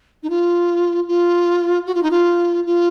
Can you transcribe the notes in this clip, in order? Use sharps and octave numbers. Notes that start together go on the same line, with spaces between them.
D#4
F4
F4
F#4
F4
D#4
F4
F4